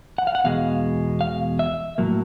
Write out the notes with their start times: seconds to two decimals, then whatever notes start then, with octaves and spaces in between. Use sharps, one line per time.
0.18 F#5
0.27 F5
0.35 F#5
0.44 E2 B2 G#3 F5
1.21 F5
1.59 E5
1.98 A2 F#3 A#3